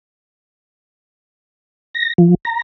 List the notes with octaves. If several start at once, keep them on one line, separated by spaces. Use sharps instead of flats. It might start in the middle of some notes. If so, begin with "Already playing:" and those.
A#6
F3
A#5